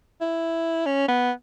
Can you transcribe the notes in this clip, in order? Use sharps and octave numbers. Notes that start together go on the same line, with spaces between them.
E4
C#4
B3